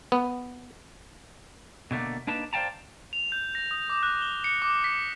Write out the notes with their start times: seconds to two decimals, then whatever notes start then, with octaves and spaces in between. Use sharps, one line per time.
0.12 B3
1.91 B2 D3 A3 A#3
2.27 A#3 D4 D#4 B4 A5
2.53 C5 D5 F5 G5 A5 A#5
3.13 F7
3.32 G6
3.55 A#6
3.71 D#6
3.90 D6
4.03 F#6
4.22 G7
4.44 C#7
4.62 D6
4.84 B6